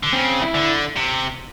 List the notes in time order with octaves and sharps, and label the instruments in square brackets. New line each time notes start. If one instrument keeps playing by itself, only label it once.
[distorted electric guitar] D3
[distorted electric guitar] C#3 [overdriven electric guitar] C4
[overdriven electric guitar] E4
[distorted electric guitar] D3
C3